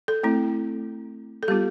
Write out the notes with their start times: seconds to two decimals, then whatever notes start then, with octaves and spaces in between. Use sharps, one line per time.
0.08 A4
0.23 A3 C4 E4
1.43 A4
1.48 G3 B3 F4 G4